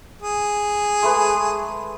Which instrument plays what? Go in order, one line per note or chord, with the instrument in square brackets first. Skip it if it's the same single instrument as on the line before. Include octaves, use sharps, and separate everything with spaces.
[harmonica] G#4
[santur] G#3 A3 B4